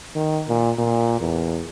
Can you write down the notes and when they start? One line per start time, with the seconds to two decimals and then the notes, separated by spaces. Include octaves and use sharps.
0.15 D#3
0.48 A#2
0.78 A#2
1.21 E2